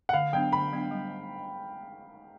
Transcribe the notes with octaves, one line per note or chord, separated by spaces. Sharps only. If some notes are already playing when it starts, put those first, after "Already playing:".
F#5
D3 F5
F#3 B3 D4 G5
D3 B5
F#3 B3 D4
G3